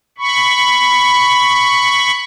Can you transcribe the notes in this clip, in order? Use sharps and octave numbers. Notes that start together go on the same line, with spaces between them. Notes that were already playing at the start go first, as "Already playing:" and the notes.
B5 C#6